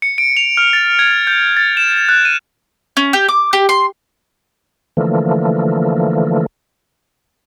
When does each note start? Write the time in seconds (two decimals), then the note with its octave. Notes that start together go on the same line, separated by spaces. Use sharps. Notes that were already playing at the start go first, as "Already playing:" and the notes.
0.02 C#7
0.18 D7
0.37 F7
0.57 F6
0.73 A6
0.99 G#6
1.27 G6
1.57 A6
1.77 E7
2.09 F#6
2.25 D#7
2.97 C#4
3.13 G4
3.28 D6
3.53 G4
3.69 C6
4.97 D3 E3 F3 A3 A#3